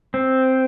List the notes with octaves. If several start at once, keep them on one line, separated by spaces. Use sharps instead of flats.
C4